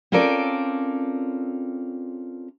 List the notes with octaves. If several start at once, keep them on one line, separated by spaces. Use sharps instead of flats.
C4 C#4 F4 A4 A#4 D5